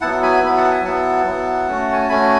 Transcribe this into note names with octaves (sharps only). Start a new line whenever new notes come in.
F#3 B3 E4 F#5 A5
G#5 B5
F#3 B3 E4 B5
F#5 A5
E5 G#5
F#3 B3 E4 F#5 A5
F#3 B3 E4
A3 C#4 F#4
G#5
A5
A3 C#4 F#4 G#5 B5